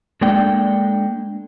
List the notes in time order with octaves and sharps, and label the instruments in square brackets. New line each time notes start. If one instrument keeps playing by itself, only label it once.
[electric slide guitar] G#3 A#3 D4 A4 D5 G5